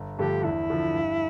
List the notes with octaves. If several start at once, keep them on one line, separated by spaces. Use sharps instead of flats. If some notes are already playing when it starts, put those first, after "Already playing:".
Already playing: G1
G2 D3 F3 A3 G4
E2 E4
D3 F3
G2